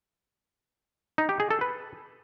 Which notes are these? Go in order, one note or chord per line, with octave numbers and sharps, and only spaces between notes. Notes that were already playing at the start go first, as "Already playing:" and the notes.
D#4
G4
G#4
A4
B4